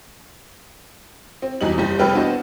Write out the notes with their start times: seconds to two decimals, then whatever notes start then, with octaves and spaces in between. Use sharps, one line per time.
1.42 C4
1.61 E2 F#3 G3 D#4 F#7
1.78 F#1 G3
1.99 F1 G3 E4 B4 G5 F6
2.15 B3 D4 F#4 C5 D#5